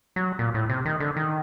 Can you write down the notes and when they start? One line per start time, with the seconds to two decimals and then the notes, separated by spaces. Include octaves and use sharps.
0.16 F#3
0.39 A#2
0.54 A2
0.70 C3
0.85 D#3
1.00 D3
1.17 D#3